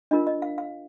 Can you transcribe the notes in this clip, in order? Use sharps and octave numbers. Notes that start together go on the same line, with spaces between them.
D4 F4 A#4 D#5
D#5
F5
F5